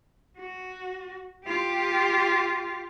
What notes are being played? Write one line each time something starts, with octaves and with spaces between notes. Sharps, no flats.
F#4
F4 G4